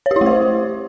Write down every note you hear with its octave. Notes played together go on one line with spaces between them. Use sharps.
C#5
G4
E4
A3
C5